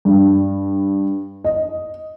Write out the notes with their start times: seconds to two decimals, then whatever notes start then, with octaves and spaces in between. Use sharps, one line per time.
0.05 G2
1.44 D#5